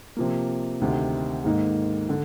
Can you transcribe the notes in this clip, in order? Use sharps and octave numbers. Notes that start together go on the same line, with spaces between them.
C3 F3 A#3
D2 C3 D#3
G#2 D#3 A#3 D#4
D3